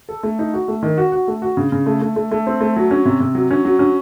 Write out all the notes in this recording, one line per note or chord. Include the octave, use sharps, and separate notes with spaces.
A4
A3
D#4
F#4
A3
D#3
F#4
F#4
A3
F#4
C#3
C#3
A3
A3
A3
A3
C4
A3
F#3
C#4
C3
C3
F#3
C#4
F#3
C#4